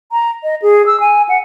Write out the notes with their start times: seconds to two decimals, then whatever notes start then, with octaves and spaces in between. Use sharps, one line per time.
0.12 A#5
0.43 D#5
0.62 G#4
0.86 E6
1.00 G#5
1.29 F#5